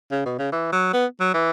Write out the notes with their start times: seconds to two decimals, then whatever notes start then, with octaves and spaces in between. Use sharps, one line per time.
0.11 C#3
0.25 B2
0.39 C#3
0.52 E3
0.72 F#3
0.93 B3
1.20 F#3
1.34 E3